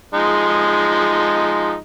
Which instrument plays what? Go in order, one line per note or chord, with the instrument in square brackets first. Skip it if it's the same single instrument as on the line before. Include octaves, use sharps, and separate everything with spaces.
[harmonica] F3 G#3 D#4